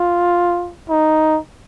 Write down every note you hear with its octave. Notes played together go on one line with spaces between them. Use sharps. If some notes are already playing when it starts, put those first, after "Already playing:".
Already playing: F4
D#4